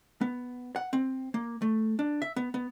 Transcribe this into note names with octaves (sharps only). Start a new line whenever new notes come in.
B3
F#5
C4
A#3
A3
D4
E5
B3
B3